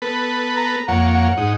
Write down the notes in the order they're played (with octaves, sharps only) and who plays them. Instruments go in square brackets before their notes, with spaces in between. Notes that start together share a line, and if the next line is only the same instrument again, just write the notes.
[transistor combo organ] B3 A4 B4
[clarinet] A#5
[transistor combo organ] F2 A#3 C#5 [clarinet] F#5
[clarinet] F#5
[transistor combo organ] G#2 D#4